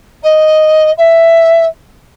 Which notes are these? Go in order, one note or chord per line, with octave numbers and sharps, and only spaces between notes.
D#5
E5